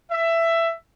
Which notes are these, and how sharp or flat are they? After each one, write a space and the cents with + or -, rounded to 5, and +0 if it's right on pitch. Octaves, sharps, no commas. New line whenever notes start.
E5 +15